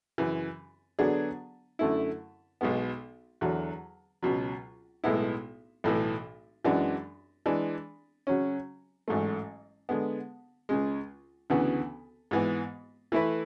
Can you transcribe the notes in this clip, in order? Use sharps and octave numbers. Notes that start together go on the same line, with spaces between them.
F#2 C#3 E3
D3 F#3 B3 D4 G#4
F#2 D3 A3 E4
B1 B2 G#3 B3
E2 D3 F#3
C#2 B2 F#3
B1 A2 G#3 B3 E4
B1 A2 E3
F#2 E3 G#3 D4 F#4
E3 G#3 D4
C#3 F#3 C#4
A1 G#2 F#3 A3
D3 G#3 B3
C#2 C#3 G#3
D2 C#3 E3 B3 F#4
G#2 E3 B3
E3 A3 E4 B4